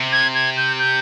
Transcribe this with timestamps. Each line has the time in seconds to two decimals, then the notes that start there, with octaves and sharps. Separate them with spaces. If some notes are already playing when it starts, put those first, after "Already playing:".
Already playing: C3
0.12 G#6
0.35 G#6
0.57 G6
0.79 G6